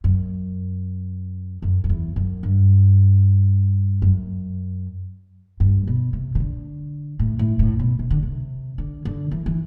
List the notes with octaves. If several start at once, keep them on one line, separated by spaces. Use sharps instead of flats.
F#2
F#2
F#2
E2
F#2
G2
F#2
G2
B2
C3
C3
D3
A2
A2
A2
B2
C3
D3
C3
D3
D3
E3
E3